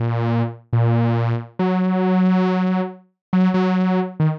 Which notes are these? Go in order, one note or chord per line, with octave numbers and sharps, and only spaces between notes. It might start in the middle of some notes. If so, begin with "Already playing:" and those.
Already playing: A#2
A#2
F#3
F#3
F#3
D#3